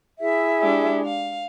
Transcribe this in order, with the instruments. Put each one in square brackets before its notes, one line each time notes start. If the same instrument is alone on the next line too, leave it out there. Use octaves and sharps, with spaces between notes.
[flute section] E4 G#4 E5
[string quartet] G#3 D4 G4
F5